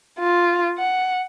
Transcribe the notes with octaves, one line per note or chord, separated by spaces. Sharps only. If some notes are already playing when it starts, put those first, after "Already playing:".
F4
F#5